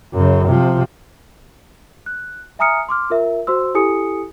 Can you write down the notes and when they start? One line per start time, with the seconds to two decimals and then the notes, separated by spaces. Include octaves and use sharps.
0.13 F#2 C#3
0.48 C3 F3
2.06 F#6
2.59 E5 G#5 A#5 D#6 F6 C#7
2.89 C6 D6 F6
3.10 F4 A#4 E5
3.47 F#4 C5 C6 E6
3.75 E4 G4 A4 G#5 D#6 C#7